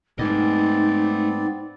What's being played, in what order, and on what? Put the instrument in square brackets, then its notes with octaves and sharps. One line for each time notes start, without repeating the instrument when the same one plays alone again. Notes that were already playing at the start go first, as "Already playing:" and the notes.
[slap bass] G#2 [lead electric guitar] A3 D#5 [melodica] B3 C4 D5 [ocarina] D#4